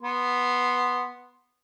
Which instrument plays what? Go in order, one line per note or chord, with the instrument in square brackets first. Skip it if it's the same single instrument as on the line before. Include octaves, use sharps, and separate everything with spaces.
[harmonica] B3 C6